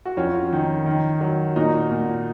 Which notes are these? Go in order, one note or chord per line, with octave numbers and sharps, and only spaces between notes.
F#4
F2 C#4 F4
D#3
D#3
F#3
A#2 D#4 F#4
A#2